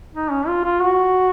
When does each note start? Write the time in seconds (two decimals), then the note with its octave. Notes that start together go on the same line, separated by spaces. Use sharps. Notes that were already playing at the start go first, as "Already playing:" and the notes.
0.15 D#4
0.31 C#4
0.48 F4
0.65 F4
0.82 F#4